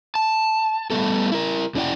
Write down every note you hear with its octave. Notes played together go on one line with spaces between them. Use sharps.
A5
G3 A3 B3 A4
E4 A#4
F2 C#4 E4 D5 F#5 G5